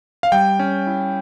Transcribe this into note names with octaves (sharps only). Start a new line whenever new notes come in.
F5
G3 G5
C#4
E4